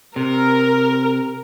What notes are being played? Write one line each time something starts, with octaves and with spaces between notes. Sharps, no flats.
C3 A#4